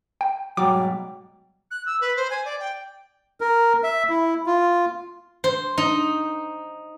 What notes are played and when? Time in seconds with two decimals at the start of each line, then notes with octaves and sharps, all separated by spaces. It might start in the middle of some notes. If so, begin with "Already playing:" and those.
0.21 G5
0.57 G#2 B2 F#3 G3 G5 D6
1.71 F#6
1.86 E6
2.01 B4
2.16 C5
2.30 G#5
2.45 D5
2.60 G5
3.41 A#4
3.84 E5
4.09 E4
4.46 F4
5.44 C5
5.78 D#4